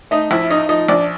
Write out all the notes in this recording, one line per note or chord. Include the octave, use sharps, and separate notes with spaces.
A3 D#4 D#5
A#1 E4 E5
A2 D#4 D#5
F3 D#4 D#5
A#1 D4 D5